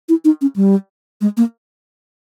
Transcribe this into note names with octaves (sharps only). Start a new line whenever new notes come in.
E4
D#4
C#4
G3
G#3
A#3